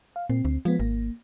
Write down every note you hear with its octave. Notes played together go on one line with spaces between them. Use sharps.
F5
A#2 C4
D2
F3 G#3 B3
G#1 A#3